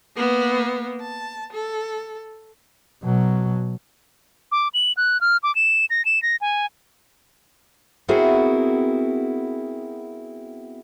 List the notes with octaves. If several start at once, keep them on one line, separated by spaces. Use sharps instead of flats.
A#3 B3
A5
A4
B2 F#3
D6
F#7
F#6
F6
D6
E7
A#6
E7
A#6
G#5
B3 C4 E4 F#4 G#4 A#4